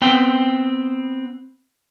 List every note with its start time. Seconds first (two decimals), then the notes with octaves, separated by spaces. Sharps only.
0.02 B3 C4 G5